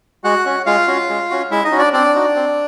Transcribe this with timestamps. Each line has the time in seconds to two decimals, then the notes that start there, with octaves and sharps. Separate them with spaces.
0.24 G#3 F#4 F#5
0.46 C#4 F#4
0.66 G#3 F4 F5
0.88 C#4 F#4
1.09 G#3
1.30 C#4 F#4
1.51 G#3 E4 E5
1.65 D#4 D#5
1.72 C#4 F#4
1.79 D4 D5
1.93 C4 D4 D5
2.15 D#4 F#4
2.35 C4